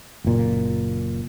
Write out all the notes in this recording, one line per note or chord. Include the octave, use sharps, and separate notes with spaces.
F#1 A#2